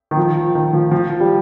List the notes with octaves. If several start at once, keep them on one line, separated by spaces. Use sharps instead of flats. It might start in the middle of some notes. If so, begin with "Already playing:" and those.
D#3
F3
D#3
F3
F3
G3